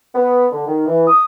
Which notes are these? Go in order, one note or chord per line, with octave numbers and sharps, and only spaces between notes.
B3
D3
D#3
E3
D#6